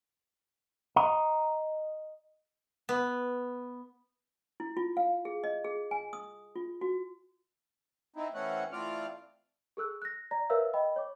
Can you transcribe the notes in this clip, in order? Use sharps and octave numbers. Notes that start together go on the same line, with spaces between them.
D#5 A#5
B3
E4
F4
F5
G#4
D#5
G#4
G#5
D#6
F4
F#4
C4 D#4 E4
E3 A3 C4 C#4 F#5
E3 A3 C4 F4 D5 F6
G#4 A4 E6 F#6
F#6 A#6
D5 A#5 A#6
A#4 B4 C#5 E5 F5 E6
D#5 G5 B5
C#5 D6